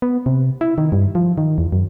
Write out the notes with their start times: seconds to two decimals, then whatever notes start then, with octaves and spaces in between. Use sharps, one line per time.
0.02 B3
0.26 C3
0.61 E4
0.78 D#3
0.92 G2
1.15 F3
1.38 D#3
1.58 E2
1.72 F#2